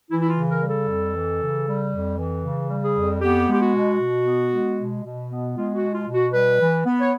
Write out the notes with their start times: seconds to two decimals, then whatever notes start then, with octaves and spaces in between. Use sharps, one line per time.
0.11 E3 E4
0.21 E4
0.30 F4
0.36 C#3
0.50 A#4
0.62 G3
0.69 A4
0.88 F2
1.14 E3
1.41 C#3
1.67 G3
1.92 F2
2.18 E3
2.44 C#3
2.70 G3
2.83 G#4
2.96 F2
3.21 B3 G4
3.48 G#3 G4
3.61 F#4
3.74 B2
4.00 B2
4.25 B3
4.52 G#3
4.78 B2
5.03 B2
5.30 B3
5.56 G#3 F4
5.75 F#4
5.81 B2
5.94 F4
6.08 B2
6.14 F#4
6.34 G3 B4
6.60 E3
6.85 B3
7.01 C#5